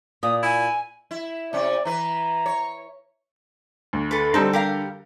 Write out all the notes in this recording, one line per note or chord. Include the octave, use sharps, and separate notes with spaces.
A#2 D#6
E4 G#5
E4
C3 C#4 D5
E3 B4 A#5
C#5
D2
A4 B4
D3 G3 C4 D#4 A4
G4 A#4 F5